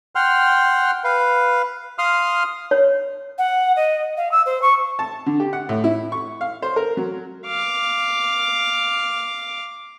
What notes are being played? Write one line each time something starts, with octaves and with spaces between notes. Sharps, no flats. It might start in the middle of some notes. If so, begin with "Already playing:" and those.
F#5 G5 C6 F6
B4 F5
F5 C6 D#6 F6
C#5
F#5
D#5
F5
E6
C5
C#6
A5
D3
G4
F#5
A2
E4
C#6
F5
C5
A#4
F#3
F5 D6